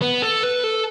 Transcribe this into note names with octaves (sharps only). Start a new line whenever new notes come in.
B3
A4
B4
A4